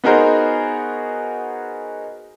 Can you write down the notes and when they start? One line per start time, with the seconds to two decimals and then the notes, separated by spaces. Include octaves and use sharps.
0.04 B3 D#4 F#4 G#4 A#4 C5